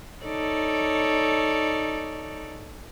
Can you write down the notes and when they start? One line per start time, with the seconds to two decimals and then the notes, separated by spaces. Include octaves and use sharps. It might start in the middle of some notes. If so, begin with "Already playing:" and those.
0.24 D#4 A4 C#5 D5